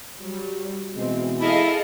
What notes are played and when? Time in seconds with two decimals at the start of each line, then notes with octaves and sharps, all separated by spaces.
0.20 F#3 G3
0.96 B2 E3 G#3 C4
1.41 E4 G#4 A4 D#5 F5